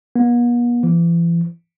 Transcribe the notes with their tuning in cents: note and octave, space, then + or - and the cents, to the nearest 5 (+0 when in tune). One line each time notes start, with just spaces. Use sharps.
B3 -45
E3 +40